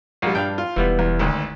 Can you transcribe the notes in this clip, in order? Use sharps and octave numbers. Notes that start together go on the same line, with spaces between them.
A#1 G3 F4 F#4
G2 D4 F5 G5
F4
E1 E3 G3 B3
E2
G#1 D2